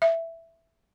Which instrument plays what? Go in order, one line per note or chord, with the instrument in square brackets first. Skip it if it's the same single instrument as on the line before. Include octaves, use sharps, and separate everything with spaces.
[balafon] E5